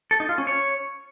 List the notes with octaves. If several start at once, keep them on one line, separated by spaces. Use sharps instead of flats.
A4
D#4
F4
C#4
C#5